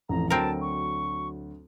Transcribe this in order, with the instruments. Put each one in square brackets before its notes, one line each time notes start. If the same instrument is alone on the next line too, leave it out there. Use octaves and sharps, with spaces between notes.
[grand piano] A1 F2 A2 [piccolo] A#5
[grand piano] D2 F#3 D7 [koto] C4 A#4 [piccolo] A5
[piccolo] C#6